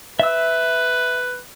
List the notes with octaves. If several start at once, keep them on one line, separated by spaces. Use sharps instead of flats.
B4 E5 E6